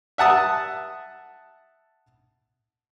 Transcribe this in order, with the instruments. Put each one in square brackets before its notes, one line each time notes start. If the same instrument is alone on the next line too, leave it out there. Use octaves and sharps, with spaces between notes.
[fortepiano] E5 F#5 A5 D#6